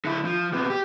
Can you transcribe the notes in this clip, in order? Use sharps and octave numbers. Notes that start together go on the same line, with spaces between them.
D3 E4
F3
C3 B3
G4